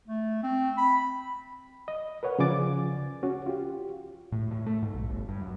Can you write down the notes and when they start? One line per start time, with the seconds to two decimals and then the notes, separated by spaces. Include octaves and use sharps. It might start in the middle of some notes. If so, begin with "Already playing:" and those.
0.08 A3
0.43 C4
0.78 B5
1.88 D#5
2.23 A#4 B4 C#5 F#5
2.39 C#3 F3 D5 G#5 D6 A6
3.23 C#4 F#4
3.46 F4 G4
4.32 A2
4.51 A2
4.66 A3
4.82 G#2
4.94 B1
5.09 G1
5.29 G2
5.41 F#2